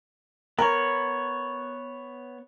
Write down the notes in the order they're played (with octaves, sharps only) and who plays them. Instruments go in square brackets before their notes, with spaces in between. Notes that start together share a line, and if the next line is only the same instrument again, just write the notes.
[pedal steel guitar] B3 C#5 [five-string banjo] A#4